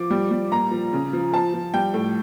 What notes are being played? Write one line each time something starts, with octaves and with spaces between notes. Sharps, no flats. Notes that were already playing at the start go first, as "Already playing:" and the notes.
Already playing: F3 D6
G3
G3
A#2 A#5
F3
C#3
F3
F3 A5
F3
G3 G5
A2